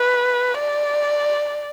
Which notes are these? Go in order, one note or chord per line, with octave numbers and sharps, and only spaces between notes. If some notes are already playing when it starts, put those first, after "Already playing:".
Already playing: B4
D5